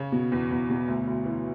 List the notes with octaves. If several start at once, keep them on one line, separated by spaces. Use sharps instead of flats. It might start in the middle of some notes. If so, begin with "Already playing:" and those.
Already playing: C#3 C#5
B2
E2
E2
B2
D2
D2
E3